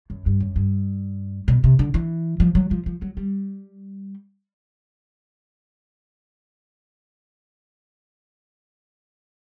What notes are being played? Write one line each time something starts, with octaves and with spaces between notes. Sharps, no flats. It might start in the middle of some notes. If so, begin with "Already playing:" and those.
F#2
G2
F#2
G2
B2
C3
D3
E3
F3
F#3
F3
F3
F#3
G3